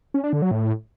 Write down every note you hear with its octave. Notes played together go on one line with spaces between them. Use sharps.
C#4
D4
D3
F#3
A2